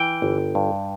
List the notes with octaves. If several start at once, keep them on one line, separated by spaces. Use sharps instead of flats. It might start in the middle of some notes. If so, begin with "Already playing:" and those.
Already playing: E3 G5
G1
G2